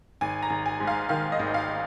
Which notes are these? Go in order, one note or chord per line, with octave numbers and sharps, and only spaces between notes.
G#1 G#5
A#5
G#1
G#5
G#2
F5
D#3 F5
D#5
G#1
F5